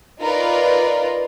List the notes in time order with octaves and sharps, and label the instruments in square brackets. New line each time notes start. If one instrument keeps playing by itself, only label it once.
[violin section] D#4 F4 A#4 B4 D5